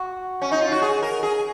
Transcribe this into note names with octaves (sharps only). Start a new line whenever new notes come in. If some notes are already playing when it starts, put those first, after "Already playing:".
Already playing: F#4
C#4
D#4
F4
F#4
G#4
A#4
G#4